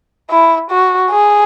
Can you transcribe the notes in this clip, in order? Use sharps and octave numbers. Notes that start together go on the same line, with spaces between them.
E4
F#4
G#4